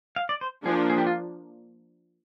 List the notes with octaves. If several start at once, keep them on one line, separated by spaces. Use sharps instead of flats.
F5
D5
C5
F3 A#3 D4 G#4
G#4
G4
F4